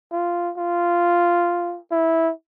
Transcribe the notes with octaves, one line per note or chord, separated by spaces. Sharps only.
F4
F4
E4